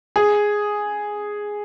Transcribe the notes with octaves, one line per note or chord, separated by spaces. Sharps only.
G#4